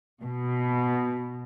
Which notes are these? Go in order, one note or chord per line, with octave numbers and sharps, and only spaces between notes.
B2